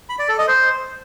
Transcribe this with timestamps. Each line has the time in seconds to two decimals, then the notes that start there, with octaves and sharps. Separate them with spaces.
0.09 B5
0.19 D5
0.29 A4
0.38 D#5
0.48 C5